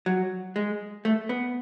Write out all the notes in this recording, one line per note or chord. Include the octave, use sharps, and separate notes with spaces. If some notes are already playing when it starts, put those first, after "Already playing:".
F#3
G#3
A3
B3